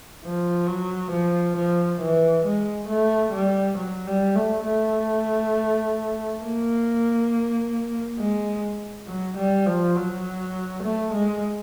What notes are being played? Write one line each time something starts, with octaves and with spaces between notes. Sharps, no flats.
F3
F#3
F3
F3
E3
G#3
A3
G3
F#3
G3
A3
A3
A#3
G#3
F#3
G3
F3
F#3
A3
G#3